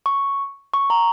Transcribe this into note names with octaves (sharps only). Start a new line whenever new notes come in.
C#6
C#6
A#5